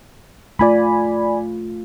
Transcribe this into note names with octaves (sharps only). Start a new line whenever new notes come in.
A3 F4 D5 G#5 B5